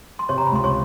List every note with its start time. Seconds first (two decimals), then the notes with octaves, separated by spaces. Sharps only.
0.19 C6
0.29 C3 C#5 C#6
0.38 A#5
0.47 B5
0.52 C#2 C6
0.64 C#5 C#6